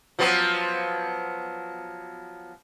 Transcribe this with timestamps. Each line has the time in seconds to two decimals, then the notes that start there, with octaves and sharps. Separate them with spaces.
0.19 F3 F#3 B3